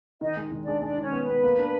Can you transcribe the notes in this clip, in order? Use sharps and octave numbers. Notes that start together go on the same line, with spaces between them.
D#3 D#4 D#5
G#3
D#3
D4 D5
G#3
G#3 D4 D5
D#3
C#4 C#5
B3
B4
B3
A#3
D4